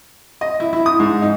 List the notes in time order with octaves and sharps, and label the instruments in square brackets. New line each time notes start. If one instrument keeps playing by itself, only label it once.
[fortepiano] D#5
E4
E4
D#6
G#2
D#4